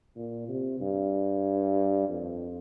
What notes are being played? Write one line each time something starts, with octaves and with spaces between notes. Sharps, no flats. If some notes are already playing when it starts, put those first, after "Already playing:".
A#2
C3
G2
F2